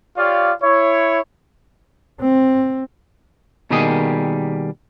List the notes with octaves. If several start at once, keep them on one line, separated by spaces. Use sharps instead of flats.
F4 G4 C#5 D5 F5
E4 C#5
C4
B2 D#3 G3 A#3 G#4 D#5